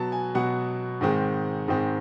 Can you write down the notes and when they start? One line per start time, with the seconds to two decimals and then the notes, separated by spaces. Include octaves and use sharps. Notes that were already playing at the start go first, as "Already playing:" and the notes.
Already playing: B2 F#3 B3 A5
0.12 G#5
0.35 B2 F#3 B3 F#5
1.01 G#2 D#3 G#3 C4
1.68 G#2 D#3 G#3 C4